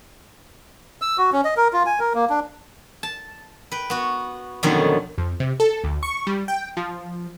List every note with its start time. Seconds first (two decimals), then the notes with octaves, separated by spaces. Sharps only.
1.02 E6
1.18 F#4
1.32 C#4
1.45 D#5
1.57 A#4
1.73 F4
1.86 G#5
2.00 A#4
2.15 A#3
2.30 D4
3.03 A5
3.71 B4 G5
3.90 B3 F#4
4.63 F2 B2 D3 D#3 F#3 C#4
5.18 F2
5.40 C3
5.60 A4
5.84 D2
6.03 C#6
6.27 G3
6.48 G5
6.77 F3